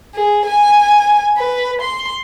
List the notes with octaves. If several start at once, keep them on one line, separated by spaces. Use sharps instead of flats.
G#4
G#5
B4
C6